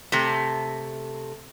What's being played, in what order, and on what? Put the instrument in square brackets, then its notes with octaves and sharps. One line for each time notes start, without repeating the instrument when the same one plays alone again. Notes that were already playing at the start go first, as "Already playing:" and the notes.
[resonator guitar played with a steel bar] C3 A3